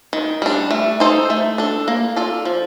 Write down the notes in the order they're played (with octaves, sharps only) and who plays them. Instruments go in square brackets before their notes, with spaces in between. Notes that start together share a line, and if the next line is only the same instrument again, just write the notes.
[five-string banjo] D#3
G3 D4
A3
D#4 A4 C5
A3
D4 A4
A#3
F4 A4 D5
F3